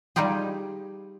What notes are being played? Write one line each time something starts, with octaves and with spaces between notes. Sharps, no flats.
G3 D#4 F4 G4 G#4